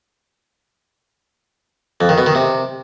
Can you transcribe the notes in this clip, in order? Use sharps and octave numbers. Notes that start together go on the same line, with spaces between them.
F2
D#3
B2
D#3
C3